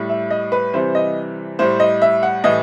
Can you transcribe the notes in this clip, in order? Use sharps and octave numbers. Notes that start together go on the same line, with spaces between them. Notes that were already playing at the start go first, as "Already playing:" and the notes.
Already playing: A2 G3
E5
D#5
B4
C3 E3 G3 C5
D#5
A2 G3 C5
D#5
E5
F#5
A2 E3 G3 D#5